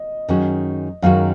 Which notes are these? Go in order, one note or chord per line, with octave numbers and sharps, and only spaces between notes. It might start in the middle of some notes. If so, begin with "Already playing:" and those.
Already playing: D#5
F#2 D#3 G#3 C#4 F#4
F#2 D#3 G#3 C#4 F#4 F5